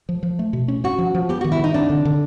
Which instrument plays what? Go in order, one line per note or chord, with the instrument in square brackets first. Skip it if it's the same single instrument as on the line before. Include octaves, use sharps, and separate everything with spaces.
[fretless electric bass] F3
F3
A3
B2
C#4
[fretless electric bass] C#4 [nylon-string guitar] F#4
[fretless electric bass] F3
F3
[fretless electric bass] B3 [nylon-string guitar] G4
[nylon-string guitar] F#4
[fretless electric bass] D#3
[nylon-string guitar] E4
[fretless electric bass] D#3 [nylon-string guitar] D#4
[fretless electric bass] C4 [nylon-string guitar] D4
[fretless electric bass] D3
D3